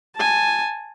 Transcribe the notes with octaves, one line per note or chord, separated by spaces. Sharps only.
G#5 A5